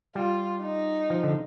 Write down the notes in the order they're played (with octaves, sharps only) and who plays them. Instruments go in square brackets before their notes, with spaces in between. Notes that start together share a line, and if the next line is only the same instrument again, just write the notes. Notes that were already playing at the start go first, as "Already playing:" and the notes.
[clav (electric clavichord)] G3 [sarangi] F4
[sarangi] D#4
[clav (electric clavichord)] F3
D3